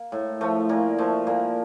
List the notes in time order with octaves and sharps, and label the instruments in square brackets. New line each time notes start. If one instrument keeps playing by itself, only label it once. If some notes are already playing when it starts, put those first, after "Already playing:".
Already playing: [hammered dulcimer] A#3
A2
F3 A3
A#2 A#3
F3 A3
A#2 A#3